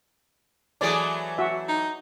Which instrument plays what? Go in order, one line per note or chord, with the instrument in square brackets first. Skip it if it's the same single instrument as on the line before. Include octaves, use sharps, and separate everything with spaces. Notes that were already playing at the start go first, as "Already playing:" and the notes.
[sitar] E3 F#3 A3 [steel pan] G#4 D5
[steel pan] F#4 E5
[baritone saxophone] D#4